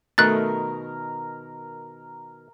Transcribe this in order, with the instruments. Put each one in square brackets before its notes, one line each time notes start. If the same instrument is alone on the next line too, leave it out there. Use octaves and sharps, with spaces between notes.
[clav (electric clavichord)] B2 D#3 [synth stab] A3 [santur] A#4 [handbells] F#6 A6